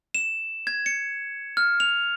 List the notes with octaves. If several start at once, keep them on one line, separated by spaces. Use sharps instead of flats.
E7
G#6
C#7
F6
F7